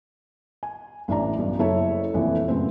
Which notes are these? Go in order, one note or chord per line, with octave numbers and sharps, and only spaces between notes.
G#5
A1 E3 D4 D5 A#5
B1 G2
F#1 E4 A4 C#5 E5
F1 A#1 E3
F#2 A2 C#3 B3 C4